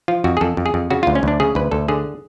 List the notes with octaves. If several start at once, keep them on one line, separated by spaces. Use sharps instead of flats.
F3 F4
F2 F#4
G#4
F2 A4
F2
G#4
F2
C#3 F#4
D2 F4
C#4
D2 D4
C#3 G#4
D2 B4
D2 A4
D3 G#4